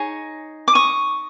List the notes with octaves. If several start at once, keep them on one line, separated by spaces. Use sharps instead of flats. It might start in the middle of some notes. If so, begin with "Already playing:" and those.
Already playing: D#4 G#4 C#5
D6
C#6 D#6